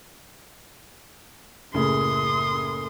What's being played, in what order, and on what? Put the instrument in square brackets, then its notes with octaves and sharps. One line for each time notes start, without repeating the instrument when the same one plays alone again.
[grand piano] F#1 A2 C#3 [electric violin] C6 D#6